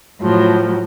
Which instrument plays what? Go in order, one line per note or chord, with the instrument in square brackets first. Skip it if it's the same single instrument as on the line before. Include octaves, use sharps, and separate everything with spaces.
[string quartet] A2 F3 F#3